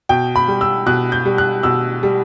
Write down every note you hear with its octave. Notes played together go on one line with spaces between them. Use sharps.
B2 G5
B5
G3
E6
B2 F#6
G6
G3
F#6
B2 E6
G3